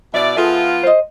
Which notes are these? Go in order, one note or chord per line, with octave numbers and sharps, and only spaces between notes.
B2 E4 D5 E5
F3 B3 F4 G#4 A4 E5
C5 D#5